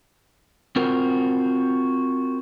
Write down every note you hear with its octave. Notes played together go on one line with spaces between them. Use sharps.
C4 F4 F#4 A#4 C5